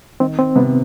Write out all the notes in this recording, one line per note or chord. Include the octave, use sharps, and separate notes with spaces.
D#3 C4
C4
C3 B3